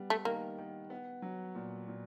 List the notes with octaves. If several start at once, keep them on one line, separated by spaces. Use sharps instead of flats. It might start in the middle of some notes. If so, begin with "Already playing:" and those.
Already playing: G3 B3
A3
D#3 A#3
D#3
B3
F#3
A#2
A#2